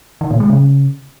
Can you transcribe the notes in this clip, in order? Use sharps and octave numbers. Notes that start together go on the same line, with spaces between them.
D#3
A#2
G#3
C#3